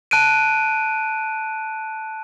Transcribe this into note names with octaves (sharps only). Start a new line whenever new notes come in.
A5 F#6 D7 D#7